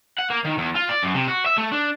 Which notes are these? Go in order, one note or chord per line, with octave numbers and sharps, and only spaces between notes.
F#5
A#3
D#3
E2
F4
D5
F#2
C3
F#4
E5
A3
D4